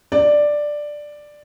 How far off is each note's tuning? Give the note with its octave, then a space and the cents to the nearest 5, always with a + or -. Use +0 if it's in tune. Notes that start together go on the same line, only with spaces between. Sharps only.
D5 +5